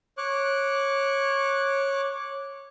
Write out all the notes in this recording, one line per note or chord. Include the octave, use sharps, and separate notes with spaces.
C#5 D6 F#6